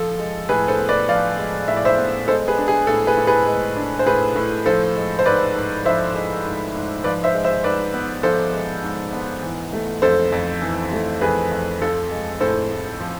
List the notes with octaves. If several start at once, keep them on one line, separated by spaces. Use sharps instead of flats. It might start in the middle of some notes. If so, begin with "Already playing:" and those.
Already playing: F3 A4
G#3
A2 G#4 B4
A4 C5
B3
B4 D5
F3 D5 F5
G#3
A2 E5
D5
C5 E5
B3
G#3 A4 C5
G#4 B4
D4
G#4
A2 A4
G#4 B4
A2
G#4 B4
G#3
D4
C5
A2 G#4 B4
A2
F3 A4 C5
G#3
C5
G#2 B4 D5
G#2
F3 C5 E5
G#3
G#2
G#2
F3 B4 D5
C5 E5
G#3
C5 E5
G#2 B4 D5
B3
F3 A4 C5
G#3
G#2
B3
E3
A3
F2 A4 C5
F2
E3
A3
F2 G#4 B4
F2
F3 A4
G#3
A2 A4 C5
A2
F3